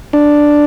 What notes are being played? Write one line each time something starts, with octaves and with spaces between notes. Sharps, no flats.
D4